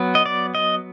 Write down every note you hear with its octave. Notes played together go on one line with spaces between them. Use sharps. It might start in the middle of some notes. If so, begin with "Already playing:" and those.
Already playing: F#3 B3
D#5
D5
D#5